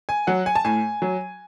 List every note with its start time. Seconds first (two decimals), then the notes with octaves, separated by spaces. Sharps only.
0.09 G#5
0.27 F#3 F#5
0.46 G#5
0.55 A5
0.64 A2 G#5
1.02 F#3